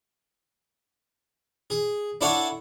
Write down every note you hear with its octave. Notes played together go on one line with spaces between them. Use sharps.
G#4
D4 E4 A4 C#5 F#5